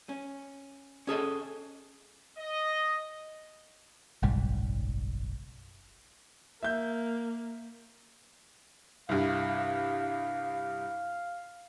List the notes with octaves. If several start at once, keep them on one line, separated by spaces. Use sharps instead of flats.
C#4
C#4 G#4 A4 D#5
D#5
F#1 B1 G#2 G3
A#3 E5 G6
C2 G2 F5